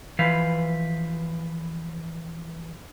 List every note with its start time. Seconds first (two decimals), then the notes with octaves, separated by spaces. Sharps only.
0.19 E3 F3 B4 F5